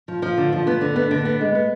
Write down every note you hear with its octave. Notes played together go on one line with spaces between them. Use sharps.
F3
F3
D3
F3
B3
D3
B3
D3
B3
G#3
B3